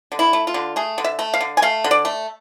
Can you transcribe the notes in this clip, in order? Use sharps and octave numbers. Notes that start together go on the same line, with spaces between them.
D3
E4
A3
F4
D3
A3 G#4
D3
E5
A3
F5
D3
G#5
A3 F5
D3
D5
A3